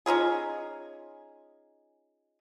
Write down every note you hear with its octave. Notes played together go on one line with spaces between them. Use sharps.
C#4 D#4 F4 G#4